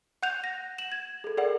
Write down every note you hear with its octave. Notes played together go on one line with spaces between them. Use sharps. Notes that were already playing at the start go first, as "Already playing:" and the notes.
F#5 F#6 G6 F7
A#6
E7 F#7
G#6
G#4 A4
G#4 A#4 D5 F#5